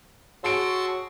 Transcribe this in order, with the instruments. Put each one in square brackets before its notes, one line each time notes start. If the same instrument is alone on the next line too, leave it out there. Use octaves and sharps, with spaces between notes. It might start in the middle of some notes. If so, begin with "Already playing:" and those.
[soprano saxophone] F#4 [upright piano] G#4 D7 [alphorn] C#5 [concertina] A5 C6 E6